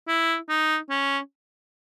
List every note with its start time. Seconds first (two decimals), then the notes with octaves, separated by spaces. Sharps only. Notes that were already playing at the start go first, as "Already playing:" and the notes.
0.08 E4
0.49 D#4
0.90 C#4